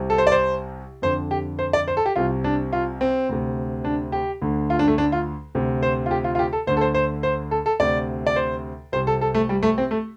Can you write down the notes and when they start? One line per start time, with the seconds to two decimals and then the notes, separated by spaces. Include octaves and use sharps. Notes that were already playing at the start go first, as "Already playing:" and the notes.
Already playing: C2 C3
0.10 A4
0.18 C5
0.27 D5
0.32 C5
1.02 F2 D3 C5
1.31 G4
1.59 C5
1.73 D5
1.88 C5
1.97 A4
2.06 G4
2.16 C2 C3 F4
2.44 D4
2.73 F4
3.01 C4
3.29 D2 C3
3.84 D4
4.12 G4
4.42 D2 D3
4.70 F4
4.79 D4
4.88 A3
4.98 D4
5.12 F4
5.55 D2 C3
5.83 C5
6.06 F4
6.11 G4
6.24 F4
6.35 F4
6.39 G4
6.53 A4
6.67 D2 D3 C5
6.77 A4
6.81 C5
6.94 C5
7.23 C5
7.51 A4
7.66 A4
7.79 D2 C3 D5
8.27 D5
8.36 C5
8.92 C2 C3 C5
9.07 A4
9.21 A4
9.34 A3
9.49 G3
9.63 A3
9.78 C4
9.91 A3